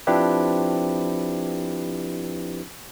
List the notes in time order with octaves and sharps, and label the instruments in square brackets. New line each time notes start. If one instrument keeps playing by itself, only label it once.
[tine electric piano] F3 C4 D4 E4 G4 B4